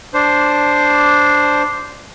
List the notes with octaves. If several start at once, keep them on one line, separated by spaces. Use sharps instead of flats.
D4 C5